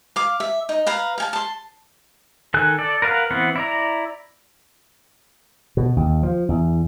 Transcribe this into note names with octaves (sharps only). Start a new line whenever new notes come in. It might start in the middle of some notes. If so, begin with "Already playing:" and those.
F5 D6
E5
D#4
B4 F5 A#5
F5 G#5 A5
A5 C6
D#3 A4 G#5 F#6
A4 D5
A#4 B4 F5 F#5
E3 B3 C4 F#5
E4 D5 A#5
B2
D#2
F3
E2